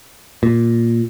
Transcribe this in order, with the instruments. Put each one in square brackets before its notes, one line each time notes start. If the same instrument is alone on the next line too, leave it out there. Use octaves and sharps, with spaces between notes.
[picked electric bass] A#2